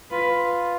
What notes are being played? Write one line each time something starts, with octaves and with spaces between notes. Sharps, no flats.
F4 B4